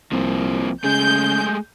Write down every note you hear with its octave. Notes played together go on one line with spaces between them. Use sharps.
C2 F3 A#3 C4
C#3 G#3 A3 G#4 G6